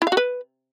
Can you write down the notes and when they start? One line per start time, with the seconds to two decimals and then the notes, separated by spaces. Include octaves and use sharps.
0.02 E4
0.07 F5
0.12 F#4
0.17 B4